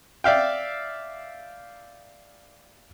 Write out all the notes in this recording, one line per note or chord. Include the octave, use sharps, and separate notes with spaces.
D5 E5 F5 G5